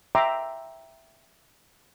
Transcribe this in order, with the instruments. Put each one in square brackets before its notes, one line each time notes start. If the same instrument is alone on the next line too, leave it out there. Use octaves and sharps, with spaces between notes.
[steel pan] E5 G5 A#5 C6 D6